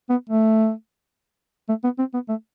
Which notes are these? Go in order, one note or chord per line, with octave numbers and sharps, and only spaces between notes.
B3
A3
A3
B3
C4
B3
A3